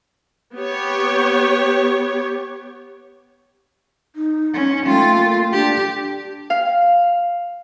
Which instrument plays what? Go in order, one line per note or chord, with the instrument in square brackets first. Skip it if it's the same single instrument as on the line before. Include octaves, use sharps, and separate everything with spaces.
[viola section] B3 G4 C#5
[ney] D#4
[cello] C#4
[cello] A3 F4 [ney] G5
[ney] A#3
[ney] D4 [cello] G4
[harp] F5